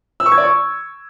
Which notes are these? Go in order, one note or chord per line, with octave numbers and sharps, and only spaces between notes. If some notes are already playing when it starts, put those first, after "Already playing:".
E6
C#6
G#6
D5
C#6